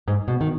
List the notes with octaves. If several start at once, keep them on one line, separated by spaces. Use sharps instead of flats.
G#2
B2
D#3